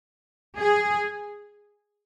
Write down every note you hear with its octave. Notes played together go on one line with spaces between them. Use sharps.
G#4